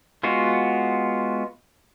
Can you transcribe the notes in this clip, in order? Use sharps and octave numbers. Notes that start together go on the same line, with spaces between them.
G#3 B3 F4 F#4